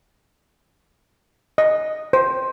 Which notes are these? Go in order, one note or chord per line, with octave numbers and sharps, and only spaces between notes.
D#5
C5